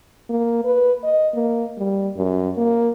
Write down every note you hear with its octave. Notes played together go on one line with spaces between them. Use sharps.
A#3
B4
D#5
A#3
G3
F#2
A#3